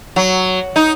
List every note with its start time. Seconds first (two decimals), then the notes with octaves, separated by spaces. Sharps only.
0.16 F#3
0.76 D#4